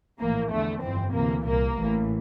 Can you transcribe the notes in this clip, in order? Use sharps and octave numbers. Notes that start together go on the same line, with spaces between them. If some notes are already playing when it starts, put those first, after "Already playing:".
A#1 A2 E3 A#3
E2 D3 A3
G1 F2 E3 C4
D2 C3 E3 A#3
C2 A#2 A#3
A1 A2 E3